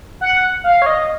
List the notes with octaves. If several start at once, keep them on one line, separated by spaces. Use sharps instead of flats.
F#5
F5
C#5
D#5